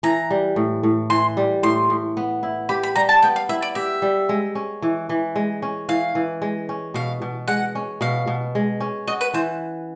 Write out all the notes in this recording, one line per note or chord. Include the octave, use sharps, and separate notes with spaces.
E3 A#5
G3
A2
A2
E3 C6
G3
A2 C6
A2
B3
E4
G4 B5
B5
G3 A#5
A5
B3 G5
F5
E4 E5
D5
G4 E5
G3
G#3
C#4
E3
E3
G#3
C#4
E3 F5
E3
G#3
C#4
B2 F5
B2
G#3 F#5
C#4
B2 F5
B2
G#3
C#4
F#4 D#5
B4
E3 C5